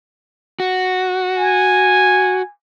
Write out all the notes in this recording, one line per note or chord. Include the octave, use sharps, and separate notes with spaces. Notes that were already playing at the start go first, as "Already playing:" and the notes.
F#4
G#5